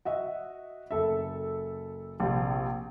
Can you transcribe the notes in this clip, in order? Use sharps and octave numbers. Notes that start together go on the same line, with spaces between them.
F#4 D#5 E5 F#5
F#1 A4 E5
A#1 C3